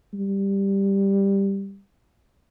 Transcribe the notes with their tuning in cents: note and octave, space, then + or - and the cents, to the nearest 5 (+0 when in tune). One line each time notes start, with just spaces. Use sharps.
G3 +5